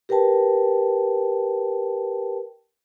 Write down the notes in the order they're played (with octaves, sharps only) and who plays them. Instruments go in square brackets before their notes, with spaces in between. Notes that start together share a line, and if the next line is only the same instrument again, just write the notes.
[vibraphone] G4 A#4 B4 G5 A5